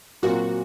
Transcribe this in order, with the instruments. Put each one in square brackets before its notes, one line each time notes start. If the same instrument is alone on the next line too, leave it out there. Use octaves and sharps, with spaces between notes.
[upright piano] A#2 F#3 C4 F4 A#4 [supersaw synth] F#4